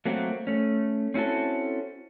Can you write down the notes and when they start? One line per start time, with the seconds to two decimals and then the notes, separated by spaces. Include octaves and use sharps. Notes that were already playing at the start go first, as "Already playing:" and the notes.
0.05 F#3 A3 A#3 C4 F#4
0.47 A3 C#4
1.14 C4 C#4 E4 F#4 A4